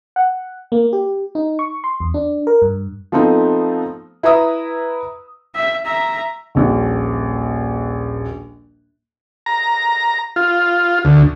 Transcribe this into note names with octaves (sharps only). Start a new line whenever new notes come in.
F#5
A#3
G4
D#4
C#6
C6
E2
D4
A#4
G2
F3 A3 B3 C4 D#4
E4 B4 E5 A#5 D#6 E6
E5
E5 A#5
D#1 A#1 F#4
A#5
F4
D2